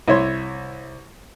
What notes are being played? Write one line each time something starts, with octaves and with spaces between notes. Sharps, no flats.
C2 E4 C#5 C6